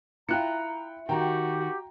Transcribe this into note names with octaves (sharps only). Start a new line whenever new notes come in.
E4 F4 G5 A#5 F#6 C#7
D#3 F#4 G4 G5 A#5